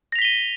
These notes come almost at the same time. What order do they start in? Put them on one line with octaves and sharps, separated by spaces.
A#6 F7 B6 G7 D#7